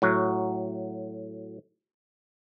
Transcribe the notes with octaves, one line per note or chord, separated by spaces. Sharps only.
A2 F#3 F#4